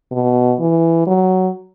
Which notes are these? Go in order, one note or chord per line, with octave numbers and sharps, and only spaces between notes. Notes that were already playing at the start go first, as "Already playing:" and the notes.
B2
E3
F#3